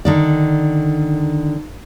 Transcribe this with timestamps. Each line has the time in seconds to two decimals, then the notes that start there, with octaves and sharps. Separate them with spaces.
0.05 D3 D#3 D5